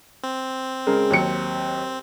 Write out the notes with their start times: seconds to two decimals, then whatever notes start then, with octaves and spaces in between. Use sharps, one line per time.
0.23 C4
0.87 C#3 G#3 A#4
1.10 D#2 F#3 C#7